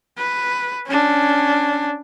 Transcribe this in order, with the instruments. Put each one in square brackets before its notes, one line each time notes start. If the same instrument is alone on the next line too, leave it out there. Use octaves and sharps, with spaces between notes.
[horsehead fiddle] B4
C#4 D4